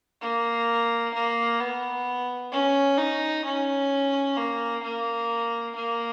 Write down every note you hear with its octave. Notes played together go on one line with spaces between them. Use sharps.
A#3
A#3
B3
C#4
D#4
C#4
A#3
A#3
A#3